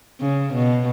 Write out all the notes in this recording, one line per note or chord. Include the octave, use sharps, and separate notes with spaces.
C#3
B2